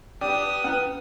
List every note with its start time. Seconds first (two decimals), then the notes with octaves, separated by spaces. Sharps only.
0.21 B3 D4 G4 D5 D#6
0.64 C#4 E4 B4 F#5